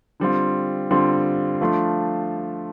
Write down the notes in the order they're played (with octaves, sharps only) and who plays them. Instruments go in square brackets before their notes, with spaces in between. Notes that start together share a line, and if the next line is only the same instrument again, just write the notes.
[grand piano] D3 G3 C4 F4
D3 G3 C4 F4
F3 A3 D4 F4